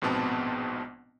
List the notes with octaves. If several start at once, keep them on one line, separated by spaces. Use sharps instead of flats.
A#1 G#2 B2 B3 C4 A5